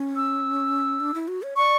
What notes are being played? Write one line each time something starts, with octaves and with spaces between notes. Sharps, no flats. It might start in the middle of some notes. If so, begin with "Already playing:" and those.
Already playing: C#4
E6
D4
E4
F#4
C#5
D5 C#6